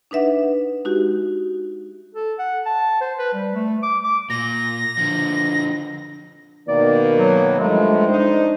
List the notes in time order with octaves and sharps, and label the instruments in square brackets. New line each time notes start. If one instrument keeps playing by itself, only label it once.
[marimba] D4 D#4 B4 E5 F#5
G#3 D#4 F#4 G4
[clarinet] A4
F#5
A5
C5
B4
G3
A3
D6
D6
[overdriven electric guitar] A#2 [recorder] A#6
[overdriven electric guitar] D3 F3
[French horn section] B2 D#3 A#3 [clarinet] D5
[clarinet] F#3
[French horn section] G2 F3 A3 [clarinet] G#3
[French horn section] D4 D#4 C5